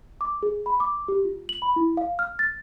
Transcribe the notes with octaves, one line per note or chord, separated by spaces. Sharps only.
D6
G#4
B5
D6
G4
F4
F#7
B5
E4
F5
F6
A6